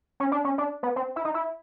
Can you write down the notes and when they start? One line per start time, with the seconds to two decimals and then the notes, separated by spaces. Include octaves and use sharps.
0.20 C#4
0.32 D4
0.44 C#4
0.58 D4
0.83 B3
0.96 C4
1.16 E4
1.25 D#4
1.34 E4